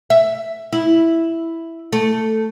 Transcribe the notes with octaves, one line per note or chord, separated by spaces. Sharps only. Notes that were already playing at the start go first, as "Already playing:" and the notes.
E5
E4
A3